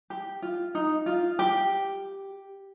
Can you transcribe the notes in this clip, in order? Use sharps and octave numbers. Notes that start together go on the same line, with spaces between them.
G4
F4
D#4
F4
G4